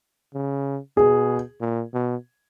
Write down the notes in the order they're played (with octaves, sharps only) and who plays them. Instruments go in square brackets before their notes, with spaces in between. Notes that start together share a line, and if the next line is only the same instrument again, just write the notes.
[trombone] C#3
[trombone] B2 [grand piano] G#4
[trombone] A#2
B2